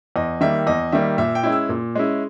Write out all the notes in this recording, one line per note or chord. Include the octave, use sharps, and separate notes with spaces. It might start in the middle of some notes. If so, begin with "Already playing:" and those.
E2 D#5
D#3 G3 A#3 E5
E2 D#5
D#3 G3 A#3 E5
A#2 E5
G5
G#3 C#4 E4
E6
A#2
G#3 C#4 E4